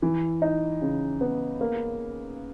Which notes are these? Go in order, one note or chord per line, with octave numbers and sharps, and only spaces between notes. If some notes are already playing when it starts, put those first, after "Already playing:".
E3
D#4
C#3
B3
A#3